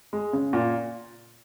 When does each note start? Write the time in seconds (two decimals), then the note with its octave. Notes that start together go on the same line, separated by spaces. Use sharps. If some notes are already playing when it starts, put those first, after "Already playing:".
0.13 G#3
0.33 C#3
0.53 A#2